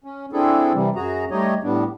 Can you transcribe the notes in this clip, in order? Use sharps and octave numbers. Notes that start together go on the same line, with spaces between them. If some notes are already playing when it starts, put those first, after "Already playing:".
C#4
C4 D4 E4 G#4 A4
C3 E3 G3
F#2 F#4 G#4 A#5
G3 A3 D#4 G4 C#5 D#5
A2 G3 B3 D4